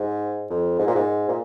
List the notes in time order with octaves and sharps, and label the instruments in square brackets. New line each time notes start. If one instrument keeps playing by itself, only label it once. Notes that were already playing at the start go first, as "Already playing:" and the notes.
Already playing: [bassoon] G#2
F2
G#2
A#2
G#2
A#2